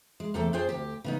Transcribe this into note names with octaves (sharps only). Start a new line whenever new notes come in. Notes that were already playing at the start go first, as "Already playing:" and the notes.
G#3
E2 C3 A3 A4 G5
F2 F4 G#4 C5 G5
D2 G2 G4
C#3 B3 D#4